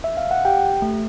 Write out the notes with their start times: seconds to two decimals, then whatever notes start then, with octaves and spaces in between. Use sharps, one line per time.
0.04 E5
0.17 F5
0.31 F#5
0.45 G4 G5
0.64 G4
0.82 A3